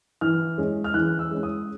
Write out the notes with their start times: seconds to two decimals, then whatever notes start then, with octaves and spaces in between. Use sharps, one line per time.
0.21 E3 F6
0.58 G#3 C#4
0.84 F6
0.94 E3 F#6
1.19 E6
1.31 G#3 C#4
1.43 D#6